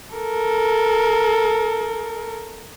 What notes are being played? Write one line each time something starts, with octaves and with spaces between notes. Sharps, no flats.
A4 A#4